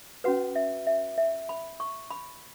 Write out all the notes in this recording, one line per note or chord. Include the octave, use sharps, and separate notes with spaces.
C#4 F#4 B4 F#5
E5
E5
E5
B5
C#6
B5